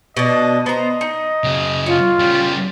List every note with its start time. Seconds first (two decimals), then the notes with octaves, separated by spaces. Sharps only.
0.17 B2 D4 D#5
0.66 B3 C5 D#5 A#5
1.01 D#4
1.44 F#2 C#3
1.86 F4 C#5
2.19 C#3 G3